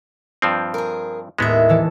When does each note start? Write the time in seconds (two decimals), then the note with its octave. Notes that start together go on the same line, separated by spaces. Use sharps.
0.42 G2 F3 C4
0.74 G#4 A#4
1.39 D#2 A2 G#3 B3 D#5 E5
1.69 D#3 E3 A4